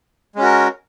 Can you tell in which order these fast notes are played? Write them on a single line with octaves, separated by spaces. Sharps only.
G#3 C#4 F#4 A#4